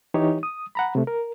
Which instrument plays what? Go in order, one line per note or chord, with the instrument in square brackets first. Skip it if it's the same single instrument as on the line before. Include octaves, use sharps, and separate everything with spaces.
[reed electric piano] E3 D#4 G4 C#5
D#6
F#5 A#5 B5
C3 A3
A#4